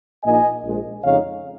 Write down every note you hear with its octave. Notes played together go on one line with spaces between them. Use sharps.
A#1 A#2 A#3 D#4 D#5 G#5
A#1 G#2 G#3
F2 C#3 G#3 D#4 C#5 F5